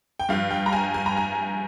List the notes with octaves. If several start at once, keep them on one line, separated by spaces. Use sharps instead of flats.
G5
G2 F3 F5
G5
A#5
G#5
G#5
A#5
G#5